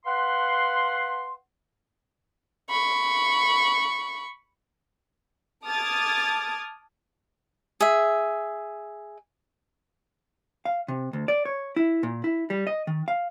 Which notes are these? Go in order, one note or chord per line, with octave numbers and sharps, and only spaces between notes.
B4 F5 F#5 C6
B5 C#6
A5 D6 D#6 F6 G#6 A6
G#4 E5
F5
C3
D2
D5
C#5
E4
A#2
E4
G3
D#5
D#3
F5